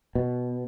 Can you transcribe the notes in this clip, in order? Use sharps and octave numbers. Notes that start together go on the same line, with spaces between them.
B2